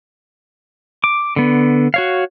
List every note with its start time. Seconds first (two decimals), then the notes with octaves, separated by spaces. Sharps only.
1.04 D6
1.36 D3 B3
1.94 F#4 C#5 F5